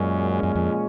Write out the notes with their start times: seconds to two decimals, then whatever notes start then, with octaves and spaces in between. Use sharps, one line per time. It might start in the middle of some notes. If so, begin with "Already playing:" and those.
Already playing: F#2 A#2 G#3 C#4
0.43 F#2
0.55 F2